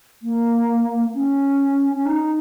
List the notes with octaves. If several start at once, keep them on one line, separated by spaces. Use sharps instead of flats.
A#3
C#4
C#4
D#4